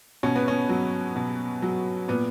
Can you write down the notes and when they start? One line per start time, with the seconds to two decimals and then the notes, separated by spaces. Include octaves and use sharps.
0.23 B2 C#4
0.36 B3
0.48 C#4
0.69 F#3
1.16 B2
1.62 F#3
2.08 A#2 B3